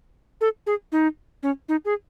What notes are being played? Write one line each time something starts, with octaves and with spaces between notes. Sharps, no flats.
A4
G#4
D#4
C#4
D#4
G#4